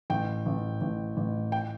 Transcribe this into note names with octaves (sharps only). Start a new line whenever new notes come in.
A1 G5
A1
A1
A1
G5